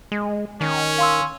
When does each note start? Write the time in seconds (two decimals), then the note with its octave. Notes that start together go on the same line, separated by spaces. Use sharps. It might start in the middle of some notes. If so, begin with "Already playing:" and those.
0.12 G#3
0.61 D#3 C#4
0.98 F5 C6 E6